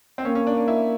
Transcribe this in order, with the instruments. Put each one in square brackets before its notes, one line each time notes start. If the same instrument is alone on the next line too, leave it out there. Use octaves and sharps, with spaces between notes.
[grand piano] C4
[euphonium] A#3 [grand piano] C#4
[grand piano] C#4
D4
D4
E4